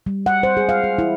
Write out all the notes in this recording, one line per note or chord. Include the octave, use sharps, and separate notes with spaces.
G3
F#5
C5
G#4
F5
G#4
E4